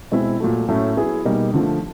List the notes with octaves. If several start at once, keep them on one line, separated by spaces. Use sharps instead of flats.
B2 G#3 C4 E4
A#2 F#3 A3
A2 F#3 A3 C#4
F#3 B3 E4 G#4
B2 G3 A#3 D#4
D3 F3 A3